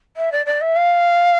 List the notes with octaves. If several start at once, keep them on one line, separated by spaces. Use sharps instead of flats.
E5
D5
D5
E5
F5